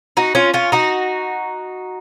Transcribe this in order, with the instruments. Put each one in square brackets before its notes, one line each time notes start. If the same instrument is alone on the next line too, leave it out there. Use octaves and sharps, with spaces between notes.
[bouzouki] D#4 F#4
C#4 F4
C#4 F4
D#4 F#4